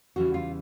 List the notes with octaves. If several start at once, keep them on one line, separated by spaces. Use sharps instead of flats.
E2 C#3 E3 G3 F#4
F4